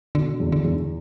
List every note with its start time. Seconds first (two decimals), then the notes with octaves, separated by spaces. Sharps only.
0.15 B2 D3
0.40 E2
0.52 D3
0.65 E2